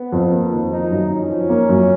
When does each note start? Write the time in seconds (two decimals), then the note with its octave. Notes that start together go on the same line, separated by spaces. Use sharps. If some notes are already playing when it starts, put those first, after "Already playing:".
Already playing: B3
0.12 F2
0.32 A#3
0.51 D#3
0.71 F3 D#4
0.91 F#2
1.10 C#4 D#4
1.30 F3
1.50 A#3
1.69 F#2